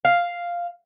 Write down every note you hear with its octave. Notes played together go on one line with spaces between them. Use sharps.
F5